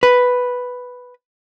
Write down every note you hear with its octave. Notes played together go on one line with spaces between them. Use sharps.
B4